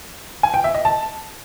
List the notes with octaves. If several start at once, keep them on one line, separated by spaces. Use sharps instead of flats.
G#5
G5
E5
D#5
A5